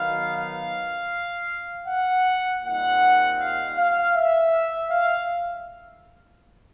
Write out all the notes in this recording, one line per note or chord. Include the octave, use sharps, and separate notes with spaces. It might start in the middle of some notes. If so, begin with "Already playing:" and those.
Already playing: D#3 F#3 B3 D#4 F5
F5
F#5
A#2 G3 C4 D#4 F#5
F5
F5
E5
F5